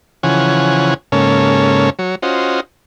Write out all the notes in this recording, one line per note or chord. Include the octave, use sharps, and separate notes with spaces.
C#3 E3 F3 C#5 F#5 G#5
G#2 C#3 A#3 C#4 A4 C#5
F#3 C#5
C#4 F4 F#4 C5 D#5